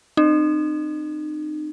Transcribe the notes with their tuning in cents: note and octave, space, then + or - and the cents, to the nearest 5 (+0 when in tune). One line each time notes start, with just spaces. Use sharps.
C4 +0 D#4 -35